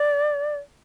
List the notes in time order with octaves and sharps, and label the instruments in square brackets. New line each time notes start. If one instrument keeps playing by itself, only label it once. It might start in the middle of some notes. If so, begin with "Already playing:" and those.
Already playing: [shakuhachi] D5